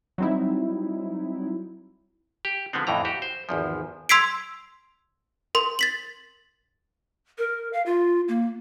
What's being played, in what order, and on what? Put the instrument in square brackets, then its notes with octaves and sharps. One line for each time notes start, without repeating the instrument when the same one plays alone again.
[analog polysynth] F#3 G3 C4 D#4 E4
[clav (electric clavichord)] G4
D3 F3 G#3 B3 C4
F2 A2 E3 A#5
F#4 G4
C5
G#1 E2 F3
[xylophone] C6 E6 G#6 B6 C7 D7
A#4 C6
A6 B6 F#7
[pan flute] A#4
F5
F4
A#3